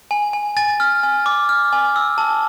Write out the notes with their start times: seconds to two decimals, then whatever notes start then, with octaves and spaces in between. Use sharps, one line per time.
0.11 G#5
0.33 G#5
0.57 G#5 A6
0.80 F6
1.03 G#5
1.26 D6
1.49 F6
1.73 G#5
1.96 E6
2.18 A5